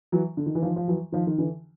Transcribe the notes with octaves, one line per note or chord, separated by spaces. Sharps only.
E3 F#3
D3
D#3
E3
D#3 F3
F3
E3 F#3
D#3 F3
D#3
D3 E3